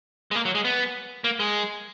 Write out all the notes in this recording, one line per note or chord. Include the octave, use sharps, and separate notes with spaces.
G#3
A#3
F#3
G#3
B3
A#3
G#3